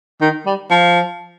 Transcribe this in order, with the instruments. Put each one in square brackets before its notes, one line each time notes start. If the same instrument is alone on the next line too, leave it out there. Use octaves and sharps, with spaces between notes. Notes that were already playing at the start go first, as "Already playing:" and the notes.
[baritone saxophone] D#3
G3
F3